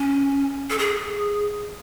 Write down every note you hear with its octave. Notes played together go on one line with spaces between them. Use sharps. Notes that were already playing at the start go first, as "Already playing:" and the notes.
Already playing: C#4
A4
G#4